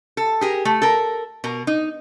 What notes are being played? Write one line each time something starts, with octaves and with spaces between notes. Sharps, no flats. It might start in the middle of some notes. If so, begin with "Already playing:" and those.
A4
G4 G#4 A#4
A3
A4 A#4
B2 A#4
D#4